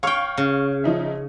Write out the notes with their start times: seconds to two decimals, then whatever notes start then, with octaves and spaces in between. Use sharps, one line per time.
0.03 C#5 F5 G5 C#6 F6
0.37 C#3
0.84 F3 D#4 E5